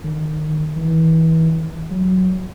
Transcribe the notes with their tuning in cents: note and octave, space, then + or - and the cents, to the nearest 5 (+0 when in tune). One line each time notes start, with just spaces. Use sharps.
D#3 -25
E3 -30
F#3 +5